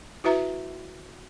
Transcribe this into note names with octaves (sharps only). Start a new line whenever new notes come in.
E4 F#4 B4 E5 A#5